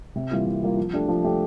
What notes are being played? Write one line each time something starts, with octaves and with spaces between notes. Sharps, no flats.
C3
E3 G3 A#3 F4
C3
E3 G3 A#3 F4
F3
A3 D4 G4
F3
A3 D4 G4